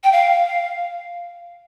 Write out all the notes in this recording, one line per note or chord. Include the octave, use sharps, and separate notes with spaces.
G5
F5